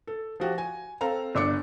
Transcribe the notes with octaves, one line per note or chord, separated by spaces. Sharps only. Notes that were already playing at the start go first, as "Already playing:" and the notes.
A4
F3 F#4 G4
G#5
C4 A4 F5 A#5
G1 D4 D6 C#7